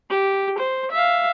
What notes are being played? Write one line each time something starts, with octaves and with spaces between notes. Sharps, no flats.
G4
C5
E5 F5